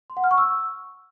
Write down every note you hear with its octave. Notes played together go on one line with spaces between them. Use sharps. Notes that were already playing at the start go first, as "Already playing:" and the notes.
C6
F#5
F6
C#6
E6